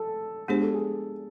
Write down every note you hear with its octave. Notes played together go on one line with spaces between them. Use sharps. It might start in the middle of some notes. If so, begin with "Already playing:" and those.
Already playing: A4
G#3 B3 D4 G4 G#4 C5
A4
G#4